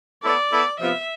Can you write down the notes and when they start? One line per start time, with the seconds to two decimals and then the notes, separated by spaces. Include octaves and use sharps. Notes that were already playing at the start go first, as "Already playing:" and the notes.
0.23 B3 E4 A4 D5
0.52 B3 E4 A4
0.80 C3 F3 B3 F4 E5